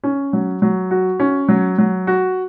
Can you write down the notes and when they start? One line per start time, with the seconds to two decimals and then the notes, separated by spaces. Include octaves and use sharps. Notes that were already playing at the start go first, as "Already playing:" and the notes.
0.04 C#4
0.33 F#3
0.62 F#3
0.91 F#4
1.20 C#4
1.48 F#3
1.78 F#3
2.07 F#4